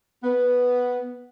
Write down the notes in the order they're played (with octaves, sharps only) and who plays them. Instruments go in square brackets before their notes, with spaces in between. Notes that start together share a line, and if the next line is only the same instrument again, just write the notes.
[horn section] B3